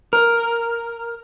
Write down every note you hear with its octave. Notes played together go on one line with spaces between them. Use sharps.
A#4